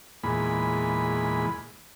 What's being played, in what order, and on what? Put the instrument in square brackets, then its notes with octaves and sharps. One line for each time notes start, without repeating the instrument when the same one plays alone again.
[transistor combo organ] E2 A#2 G#3 B5